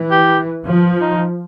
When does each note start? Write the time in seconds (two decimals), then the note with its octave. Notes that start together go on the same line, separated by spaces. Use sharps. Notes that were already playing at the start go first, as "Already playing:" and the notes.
Already playing: E3
0.11 G4
0.66 F3
1.01 D#4